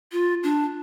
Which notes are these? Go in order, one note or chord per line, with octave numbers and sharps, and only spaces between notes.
F4
D4